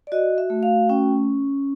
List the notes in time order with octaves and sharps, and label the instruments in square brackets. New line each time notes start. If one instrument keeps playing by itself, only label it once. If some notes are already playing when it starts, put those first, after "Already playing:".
[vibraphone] D5
F#4 D#5
E5
A3
F5
C#4 G5